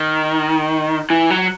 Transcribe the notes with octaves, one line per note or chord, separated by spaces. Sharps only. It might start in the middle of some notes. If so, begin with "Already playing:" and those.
Already playing: D#3
E3
F#3